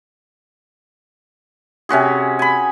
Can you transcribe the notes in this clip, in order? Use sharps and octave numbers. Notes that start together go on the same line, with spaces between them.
C3 C#4 F#4 G#4
G#5 B5